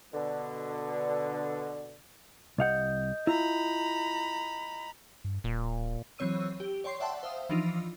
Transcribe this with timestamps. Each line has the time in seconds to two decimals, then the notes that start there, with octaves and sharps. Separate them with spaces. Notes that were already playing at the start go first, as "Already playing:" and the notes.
0.13 B2 D3
2.58 C2 D#5 F5 F#5 D#6 G6
3.27 E4 F4 A#5 B5
5.25 G2
5.44 D1 A#2
6.18 E3 F#3 C4 C#5 E6 D#7
6.60 G4
6.84 C#5 D5 G5 C6 C#6 C7
7.00 D5 E5 F#5 G5 A5 C6
7.23 C5 E5 F5 D#6
7.49 E3 F3 D4 D#4 F4